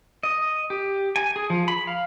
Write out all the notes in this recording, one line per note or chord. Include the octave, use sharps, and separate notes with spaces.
D#5
G4
G#5
G#4
F3
B5
F5